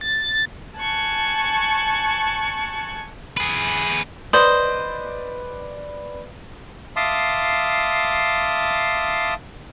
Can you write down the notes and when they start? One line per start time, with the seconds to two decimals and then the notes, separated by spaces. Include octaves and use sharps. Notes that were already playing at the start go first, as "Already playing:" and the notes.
0.01 A6
0.77 G#5 A5 C#6 F#6
3.37 G#4 B4
4.33 B4 C5 D5 D#5 F#7
6.96 E5 F5 A5 C6 D6 D#6